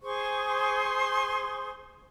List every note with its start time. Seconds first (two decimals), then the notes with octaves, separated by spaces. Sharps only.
0.02 G#4 C5 C6 C#6